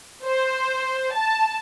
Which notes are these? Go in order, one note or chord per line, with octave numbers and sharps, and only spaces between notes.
C5
A5